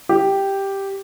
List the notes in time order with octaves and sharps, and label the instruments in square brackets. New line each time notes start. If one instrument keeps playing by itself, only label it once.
[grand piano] G4